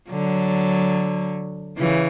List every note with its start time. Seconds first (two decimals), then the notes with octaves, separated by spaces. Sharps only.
0.10 D3 F#3
1.78 C#3 E3